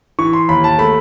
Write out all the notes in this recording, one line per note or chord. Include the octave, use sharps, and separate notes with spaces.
E3 C#6
C6
D#2 B5
A5
A3 B5